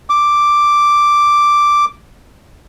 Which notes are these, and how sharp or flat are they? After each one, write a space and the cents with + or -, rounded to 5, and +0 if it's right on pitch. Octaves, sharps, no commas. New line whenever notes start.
D6 +0